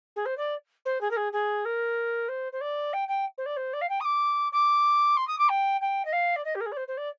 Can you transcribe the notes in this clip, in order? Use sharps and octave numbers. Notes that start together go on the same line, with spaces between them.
G#4
C5
D5
C5
G#4
A#4
G#4
G#4
A#4
C5
C5
D5
G5
G5
C5
D5
C5
D5
F5
G5
D#6
D6
D6
C6
D#6
D6
G5
G5
D#5
F5
D5
D#5
G4
A#4
G#4
D5
C5
C5
D5